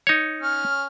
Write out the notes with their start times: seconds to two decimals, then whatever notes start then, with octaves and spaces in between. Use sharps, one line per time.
0.07 D#4 C#5
0.41 C#4 F6